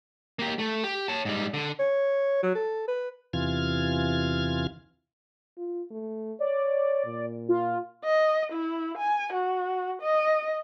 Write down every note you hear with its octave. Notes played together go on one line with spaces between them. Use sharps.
A#3 G4
A3
G4
C#5 A5
G#2 G3
D3
C#5
F#3
A4
B4
E2 C3 E3 F4 F6 G#6
F4
A3
C#5 D5
A#2
F4
D#5
E4
G#5
F#4
D#5